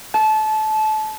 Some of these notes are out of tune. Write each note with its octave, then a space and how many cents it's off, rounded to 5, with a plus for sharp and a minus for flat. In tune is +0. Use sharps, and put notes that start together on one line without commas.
A5 -25